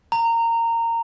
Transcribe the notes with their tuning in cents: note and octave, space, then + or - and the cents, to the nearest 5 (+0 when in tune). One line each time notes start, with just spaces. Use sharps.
A#5 -20